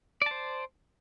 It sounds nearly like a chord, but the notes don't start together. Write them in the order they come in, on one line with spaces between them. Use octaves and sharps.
D5 A5 C5